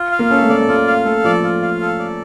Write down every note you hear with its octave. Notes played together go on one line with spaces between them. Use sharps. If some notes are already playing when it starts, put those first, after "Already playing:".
Already playing: F4
F5
A#3
C#4 A4
A3
A#3 D5
A3
A#3 F4
F5
A3 A4
F3 D5
F4
F5
A4
D5